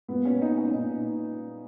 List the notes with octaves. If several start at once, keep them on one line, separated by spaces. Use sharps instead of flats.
A#2 B3
C#4
D#4
C#4
A#2 D#4